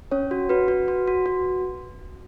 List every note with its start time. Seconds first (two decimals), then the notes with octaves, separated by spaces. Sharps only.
0.11 C#4 C#5
0.31 F#4
0.49 F#4 B4
0.68 F#4
0.88 F#4
1.08 F#4
1.26 F#4